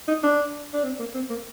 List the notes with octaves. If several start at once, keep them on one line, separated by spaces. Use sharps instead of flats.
D#4
D4
D4
C4
A#3
C4
A#3